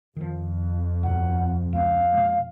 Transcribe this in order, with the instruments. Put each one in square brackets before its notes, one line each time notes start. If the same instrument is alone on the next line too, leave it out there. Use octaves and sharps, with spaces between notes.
[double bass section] F2 [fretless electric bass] D#3 F3
[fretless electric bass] D#2 G#2 B2 [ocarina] F#5
[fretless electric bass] C#2 C4 [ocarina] F5
[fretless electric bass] B2 G#3 A#3